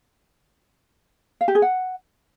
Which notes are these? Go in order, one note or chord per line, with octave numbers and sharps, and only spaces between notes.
F5
G4
G#4
F#5